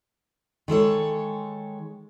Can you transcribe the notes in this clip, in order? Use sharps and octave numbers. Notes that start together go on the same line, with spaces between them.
D#3 G#3 A4 C#5